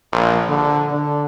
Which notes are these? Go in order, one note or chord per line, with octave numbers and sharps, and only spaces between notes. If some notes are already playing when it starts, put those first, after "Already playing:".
A#1
D3
D3